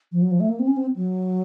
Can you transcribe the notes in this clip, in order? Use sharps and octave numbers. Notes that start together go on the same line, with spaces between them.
F3
F#3
F3
A3
A#3
C4
C#4
C4
F#3